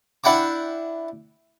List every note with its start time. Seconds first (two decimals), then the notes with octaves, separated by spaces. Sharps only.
0.24 D4 E4 F#5 G5 D6